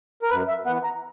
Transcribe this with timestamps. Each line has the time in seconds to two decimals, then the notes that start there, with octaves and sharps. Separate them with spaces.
0.22 A#4
0.30 F#2 B4
0.48 E5
0.66 E3 B3 F#5
0.84 A#5